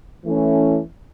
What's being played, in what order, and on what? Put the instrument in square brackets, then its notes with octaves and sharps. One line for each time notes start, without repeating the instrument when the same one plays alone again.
[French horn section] E3 A3 C#4